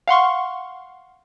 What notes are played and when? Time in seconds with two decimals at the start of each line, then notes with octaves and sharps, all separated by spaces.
0.08 F5 F#5 C6 C#6